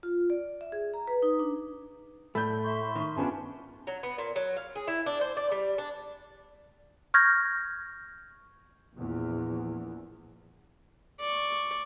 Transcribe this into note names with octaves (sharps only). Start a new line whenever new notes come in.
F4
D5
E5
G#4
A#5
B4
D#4
D4
A2 A3 D5 B5 G6
E5 C6 C#6
D#3
G2 B3 C#4 D4 F4 A5
F#3
B3
A#2
F#3
F5
G#4
E4
D4
C5
D5
G3
D4
C#6 F6 G6 G#6 A#6
A#1 E2
D5 C#6